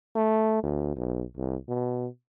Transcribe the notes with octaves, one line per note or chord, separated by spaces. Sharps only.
A3
D2
B1
C2
B2